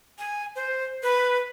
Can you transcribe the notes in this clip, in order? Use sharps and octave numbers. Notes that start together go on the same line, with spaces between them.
G#5
C5
B4